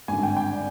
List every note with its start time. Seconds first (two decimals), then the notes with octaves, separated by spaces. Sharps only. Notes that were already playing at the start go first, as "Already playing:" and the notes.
0.08 G#1 G2 D3 G#5
0.23 G5
0.37 G5
0.51 D5